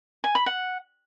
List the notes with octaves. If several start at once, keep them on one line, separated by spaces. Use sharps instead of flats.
G#5
B5
F#5